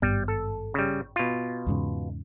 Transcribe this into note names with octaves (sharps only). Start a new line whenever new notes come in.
G#1 G2 G3 B3
A4
C#3 G3
B2 F4
E2 G#2 C#3